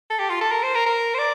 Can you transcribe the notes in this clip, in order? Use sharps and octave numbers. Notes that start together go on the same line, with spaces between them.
A4
G4
F4
A4
A#4
C5
A#4
A#4
C5
D5